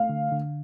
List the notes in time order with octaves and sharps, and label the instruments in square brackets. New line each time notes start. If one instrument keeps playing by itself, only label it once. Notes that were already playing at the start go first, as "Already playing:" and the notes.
Already playing: [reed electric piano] A3 [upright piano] F5
[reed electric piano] D3
D3